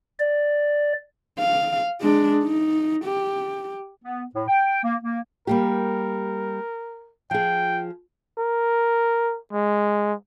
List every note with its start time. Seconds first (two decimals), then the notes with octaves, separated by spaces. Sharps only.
0.19 D5
1.39 F5
2.01 G#3 D4
2.44 D#4
3.05 G4
4.04 B3
4.35 A2
4.48 G5
4.83 A#3
5.03 A#3
5.47 G3 A#3 G4 A#4
7.31 F3 G#4 G5
8.38 A#4
9.53 G#3